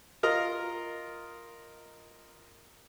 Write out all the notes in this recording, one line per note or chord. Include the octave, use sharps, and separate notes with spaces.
F4 A#4 D#5 A#5